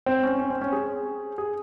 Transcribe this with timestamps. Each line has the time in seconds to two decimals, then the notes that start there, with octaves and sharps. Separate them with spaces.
0.06 C4
0.23 C#4
0.39 C#4
0.50 C4
0.61 C#4
0.72 G#4
1.38 G#4